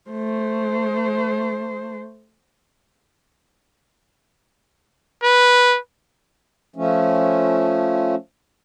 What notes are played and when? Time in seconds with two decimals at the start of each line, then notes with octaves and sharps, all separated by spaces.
0.10 A3 C5
5.24 B4
6.76 F3 A3 C#4